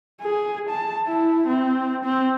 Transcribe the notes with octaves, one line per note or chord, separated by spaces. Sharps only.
G#4
A5
E4
C4
C4